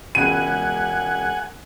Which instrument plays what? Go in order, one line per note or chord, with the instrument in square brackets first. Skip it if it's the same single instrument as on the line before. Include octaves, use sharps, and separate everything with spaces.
[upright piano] E1 C#2 B5 [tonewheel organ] F#5 G#5 [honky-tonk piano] D#7